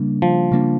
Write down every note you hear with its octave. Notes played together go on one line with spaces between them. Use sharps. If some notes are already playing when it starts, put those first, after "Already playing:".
Already playing: C#3 G3 A#3 D4
F3
C#3 G3 A#3 D4